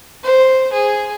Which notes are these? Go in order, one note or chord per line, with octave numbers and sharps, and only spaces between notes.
C5
G#4